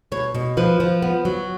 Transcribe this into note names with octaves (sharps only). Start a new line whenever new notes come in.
B2 C#5
B2
F3 B4
F3
B3
F#3